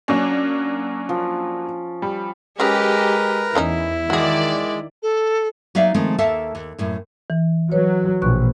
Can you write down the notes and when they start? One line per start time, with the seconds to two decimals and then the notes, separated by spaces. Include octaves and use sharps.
0.08 F#3 A#3 C#4 D4
1.09 F3
2.02 G3
2.60 F#3 G#3 C#4 G4 G#4 A#4 B4 A#5
3.55 E2 D#3 C#4 D#4 E4
4.10 D#3 G#3 F#4 G#4 D5
5.02 A4
5.75 F#3 A#3 D#4 D5 E5 F5
5.94 D#3 F3 G#3 A3 C4
6.18 D#2 A#3 A4 E5 F5 A5
6.55 D#2
6.79 F#2 A2 A#3
7.30 E3
7.72 F#3 B4 C#5
8.22 A#1 B2 C#6 F#6